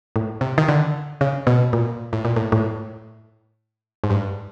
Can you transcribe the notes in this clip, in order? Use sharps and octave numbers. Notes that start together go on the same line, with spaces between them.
A2
C3
D#3
D3
C#3
B2
A#2
A2
A#2
A2
A2
G#2
G2